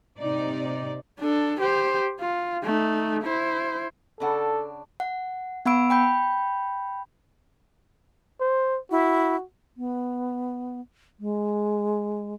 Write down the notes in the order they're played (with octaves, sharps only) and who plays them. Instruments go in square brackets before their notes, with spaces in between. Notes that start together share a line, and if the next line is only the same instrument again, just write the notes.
[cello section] C3 D#4 D5
[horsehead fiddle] D4 A4
G4 C5
F4
A3 D#4
E4 C5
[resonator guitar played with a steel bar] C#3 D4 F#5 [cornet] A4
[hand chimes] F#5
B3 F#5 B5 E6 D7
G5 B5 G6
[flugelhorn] C5
[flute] E4 [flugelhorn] F#4
[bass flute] B3
G#3